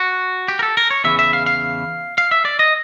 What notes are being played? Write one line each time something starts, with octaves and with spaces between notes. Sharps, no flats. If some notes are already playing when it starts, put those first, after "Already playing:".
Already playing: F#4
G4
A#4
A4
A#4
C#5
E2 C#3 E3 E5
E5
F5
F5
F5
E5
D5
D#5